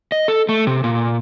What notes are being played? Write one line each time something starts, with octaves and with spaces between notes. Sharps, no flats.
D#5
A4
A3
C3
A#2